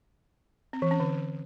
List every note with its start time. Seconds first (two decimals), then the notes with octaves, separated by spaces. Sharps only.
0.73 C4
0.82 E3
0.91 C#4
1.00 D3